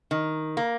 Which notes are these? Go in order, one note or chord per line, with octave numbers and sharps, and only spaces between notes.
D#3
A#3